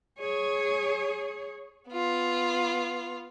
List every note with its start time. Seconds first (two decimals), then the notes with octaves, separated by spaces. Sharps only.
0.19 G#4 C#5
1.90 B3 F4